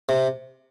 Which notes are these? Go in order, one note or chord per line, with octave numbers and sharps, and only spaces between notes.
C3